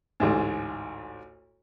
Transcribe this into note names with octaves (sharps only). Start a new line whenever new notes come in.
A1 D2 G#2